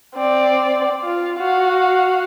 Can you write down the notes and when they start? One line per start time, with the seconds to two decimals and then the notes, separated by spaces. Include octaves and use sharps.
0.15 C4 D5
1.04 F4
1.38 F#4 F5